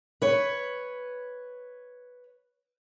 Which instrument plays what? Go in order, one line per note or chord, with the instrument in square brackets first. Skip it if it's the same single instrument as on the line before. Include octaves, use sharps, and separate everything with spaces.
[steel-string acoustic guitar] B4 C#5